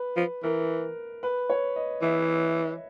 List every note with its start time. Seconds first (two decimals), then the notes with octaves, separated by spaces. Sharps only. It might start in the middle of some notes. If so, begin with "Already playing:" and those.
Already playing: B4
0.17 F3
0.43 E3 A#4
1.23 B4
1.50 C#5
1.76 D#5
2.02 E3 E5